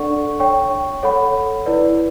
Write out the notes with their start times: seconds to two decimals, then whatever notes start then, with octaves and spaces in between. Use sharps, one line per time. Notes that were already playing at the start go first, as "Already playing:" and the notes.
Already playing: D4 A4 D5 F#5 C#6
0.40 C#5 G5 C#6
1.03 A4 C#5 F#5 B5
1.66 E4 B4 D5